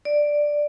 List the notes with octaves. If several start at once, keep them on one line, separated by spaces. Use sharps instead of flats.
D5